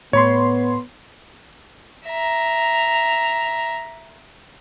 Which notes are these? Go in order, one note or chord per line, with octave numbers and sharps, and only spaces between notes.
A2 B3 C#5 B5 C6
E5 A#5